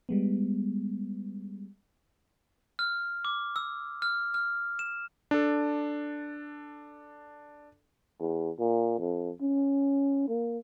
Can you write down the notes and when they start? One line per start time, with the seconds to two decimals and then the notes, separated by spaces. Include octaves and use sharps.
0.09 G3 G#3 B3
2.79 F6
3.25 D6
3.56 E6
4.02 F6
4.34 F6
4.79 E7
5.31 D4 A4
8.20 E2
8.59 A#2
8.99 F2
9.42 C#4
10.29 A#3